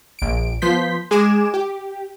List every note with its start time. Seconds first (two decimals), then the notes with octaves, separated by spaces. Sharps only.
0.19 A#1 D7
0.62 F3 B3 C6 G6 B6
1.11 G#3 G#4 G#5 D6 E7
1.54 G4